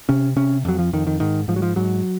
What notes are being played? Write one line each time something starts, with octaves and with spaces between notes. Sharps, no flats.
C3 C#4
C3 C#4
F2 F#3
F3
F2 D#3
D#3
G#2 D#3
G#2 F3
F#3
F3
G#2 F#3